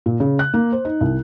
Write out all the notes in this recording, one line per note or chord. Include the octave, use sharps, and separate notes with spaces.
A#2
C#3
F#6
A#3
C5
D#4
C2